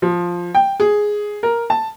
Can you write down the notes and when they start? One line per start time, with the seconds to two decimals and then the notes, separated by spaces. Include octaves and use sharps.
0.02 F3
0.55 G5
0.80 G#4
1.43 A#4
1.70 A5